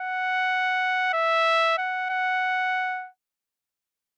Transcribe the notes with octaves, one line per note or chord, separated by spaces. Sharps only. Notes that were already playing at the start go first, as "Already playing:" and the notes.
Already playing: F#5
E5
F#5
F#5